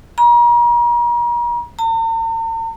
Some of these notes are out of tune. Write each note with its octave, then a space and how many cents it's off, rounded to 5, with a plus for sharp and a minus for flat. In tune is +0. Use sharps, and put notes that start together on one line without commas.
A#5 +40
A#5 -45